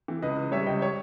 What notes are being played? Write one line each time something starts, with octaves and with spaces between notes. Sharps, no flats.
E3
C#2 B4 D#5
C#2
G3 C#5 E5
C#2 D#5 G5
C#5